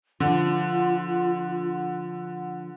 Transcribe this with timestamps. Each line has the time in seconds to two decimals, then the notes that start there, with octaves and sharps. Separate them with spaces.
0.20 D3 F3 F4